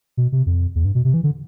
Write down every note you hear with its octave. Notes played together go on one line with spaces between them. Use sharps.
B2
C3
F2
E2
G2
B2
C3
E3
D3